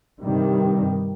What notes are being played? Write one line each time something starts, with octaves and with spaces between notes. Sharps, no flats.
G2 C3 D#3 G3